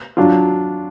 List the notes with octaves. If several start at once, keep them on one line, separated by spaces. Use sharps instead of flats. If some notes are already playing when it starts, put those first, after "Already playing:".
F#3 D4 F4